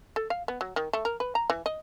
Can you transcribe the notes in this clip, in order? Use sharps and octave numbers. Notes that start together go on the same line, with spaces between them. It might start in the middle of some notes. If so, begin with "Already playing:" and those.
A4
F5
B3
F#3
D#3
A3
A#4
B4
A#5
E3
D#5